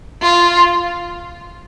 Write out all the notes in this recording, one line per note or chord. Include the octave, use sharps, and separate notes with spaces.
F4